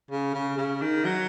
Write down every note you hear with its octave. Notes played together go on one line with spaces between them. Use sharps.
C#3
C#3
C#3
D#3
F#3